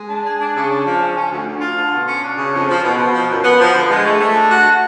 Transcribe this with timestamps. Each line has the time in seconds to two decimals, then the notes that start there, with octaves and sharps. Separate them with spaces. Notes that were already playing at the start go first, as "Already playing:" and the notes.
Already playing: G#3
0.09 D4
0.25 G#4
0.39 D4
0.55 C#3
0.70 D4
0.85 F3
1.01 C#4
1.16 C#4
1.31 D2
1.47 D2
1.61 F4
1.77 D3
1.92 B2
2.06 C#4
2.22 D4
2.37 C#3
2.53 F2
2.68 F3
2.82 B2
2.97 B2
3.12 F3
3.28 F#2
3.43 B3
3.59 F3
3.73 D3
3.89 G#3
4.05 A3
4.19 A3
4.34 D4
4.50 F#4